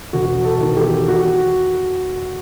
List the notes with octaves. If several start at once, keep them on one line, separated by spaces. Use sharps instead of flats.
E1 F#4
A4
E2 D#3
G4
F#4